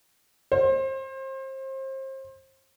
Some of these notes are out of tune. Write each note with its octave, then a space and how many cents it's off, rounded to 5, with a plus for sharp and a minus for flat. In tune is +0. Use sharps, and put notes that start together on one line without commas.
C5 +30